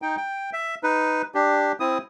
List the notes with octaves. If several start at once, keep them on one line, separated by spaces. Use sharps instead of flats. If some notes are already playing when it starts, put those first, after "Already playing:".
D#4 G5
G5
E5
D#4 B4
D4 G4
C4 E4 D#6